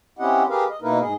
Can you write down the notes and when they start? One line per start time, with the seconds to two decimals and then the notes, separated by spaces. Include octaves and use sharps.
0.19 C4 C#4 E4 G4 D#5 F#5
0.49 G4 G#4 A#4 B4 F5
0.70 D#5
0.82 B2 A#3 D#4 E4 A#4 B4
1.00 G#2 G#4 D#5